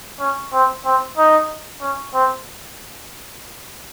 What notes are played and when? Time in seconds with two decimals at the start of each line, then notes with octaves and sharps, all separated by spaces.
0.20 C#4
0.53 C4
0.85 C4
1.18 D#4
1.81 C#4
2.14 C4